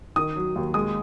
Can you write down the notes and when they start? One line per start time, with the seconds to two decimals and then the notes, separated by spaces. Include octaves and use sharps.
0.16 D#3 D#6
0.36 F#3
0.56 D#2
0.74 G#3 D#6